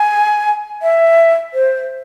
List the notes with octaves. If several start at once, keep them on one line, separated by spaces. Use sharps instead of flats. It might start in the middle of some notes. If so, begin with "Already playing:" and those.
Already playing: G#5
E5
C5